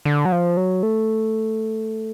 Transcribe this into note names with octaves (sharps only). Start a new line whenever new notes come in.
D3
F#3
F3
F#3
A3